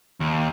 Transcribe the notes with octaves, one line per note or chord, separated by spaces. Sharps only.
D#2